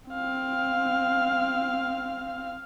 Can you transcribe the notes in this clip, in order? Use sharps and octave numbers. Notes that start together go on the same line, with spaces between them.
C4 F5